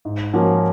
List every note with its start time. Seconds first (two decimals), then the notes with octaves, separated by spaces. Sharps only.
0.05 G#2
0.33 F3 A#3 C#4 F#4